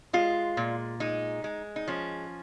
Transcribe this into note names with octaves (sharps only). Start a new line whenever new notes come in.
G#3 F4
A#2
G#3 D#4
G#3
D#4
F3 C#4